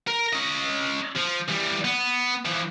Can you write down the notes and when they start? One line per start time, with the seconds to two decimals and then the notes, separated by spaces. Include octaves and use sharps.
0.07 A#4
0.33 C#4 D#5
1.16 F3
1.48 E3 G3
1.84 B3
2.45 E3 F3